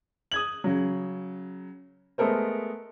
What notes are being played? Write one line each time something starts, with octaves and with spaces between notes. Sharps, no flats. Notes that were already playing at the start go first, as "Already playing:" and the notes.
D#6 G#6 F#7
C#3 F#3
G#3 A3 B3 A4 A#4 C5